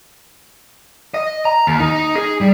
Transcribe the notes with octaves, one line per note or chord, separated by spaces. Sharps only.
D#5
A#5
D#2
D#4
G#4
G3